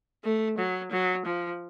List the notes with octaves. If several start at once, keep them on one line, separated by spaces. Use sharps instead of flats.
A3
F#3
F#3
F3